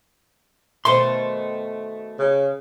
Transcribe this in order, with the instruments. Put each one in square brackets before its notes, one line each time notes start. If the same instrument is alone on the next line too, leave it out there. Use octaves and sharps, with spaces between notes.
[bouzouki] B2 D#3 A3 [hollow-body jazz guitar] C5 C6
[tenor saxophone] C#3